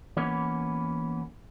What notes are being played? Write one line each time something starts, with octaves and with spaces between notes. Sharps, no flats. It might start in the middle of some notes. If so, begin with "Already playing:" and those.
E3 A#3 B3 C#4